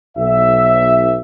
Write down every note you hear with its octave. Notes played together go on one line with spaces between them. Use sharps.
B1 E5